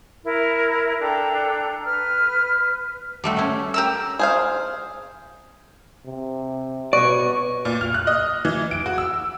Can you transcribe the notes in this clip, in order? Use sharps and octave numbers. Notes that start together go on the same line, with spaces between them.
E4 A#4
D4 A4 G5 A#5
B4 F6
G3 A3 F#4
A3 C#4
G4 A#4 E6
G#4 C5 F5
C3
B2 B4 C#5 D5 C#6
A#2
F6
F#6
D#5
E3
D7
F#4
E6